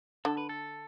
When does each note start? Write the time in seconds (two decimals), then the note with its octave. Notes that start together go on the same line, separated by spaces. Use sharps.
0.25 D3 A4
0.37 B4
0.49 A4